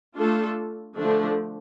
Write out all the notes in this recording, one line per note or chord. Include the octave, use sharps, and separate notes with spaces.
A3 D4 F4 A4
D3 F3 A3 D4